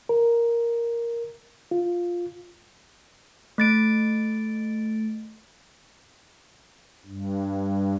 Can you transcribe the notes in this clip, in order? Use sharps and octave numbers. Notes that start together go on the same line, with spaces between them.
A#4
F4
A3 A6 D7
G2